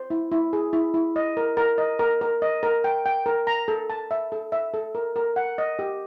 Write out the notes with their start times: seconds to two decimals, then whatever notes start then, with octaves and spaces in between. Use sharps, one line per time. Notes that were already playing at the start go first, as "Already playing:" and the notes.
Already playing: C5
0.10 E4
0.32 E4
0.53 G#4
0.73 E4
0.94 E4
1.16 D#5
1.37 A#4
1.57 A#4
1.78 D#5
1.99 A#4
2.21 A#4
2.42 D#5
2.63 A#4
2.84 G5
3.06 G5
3.26 A#4
3.47 A#5
3.68 A4
3.90 A5
4.11 E5
4.32 A4
4.52 E5
4.74 A4
4.95 A#4
5.16 A#4
5.36 F#5
5.58 D#5
5.79 G4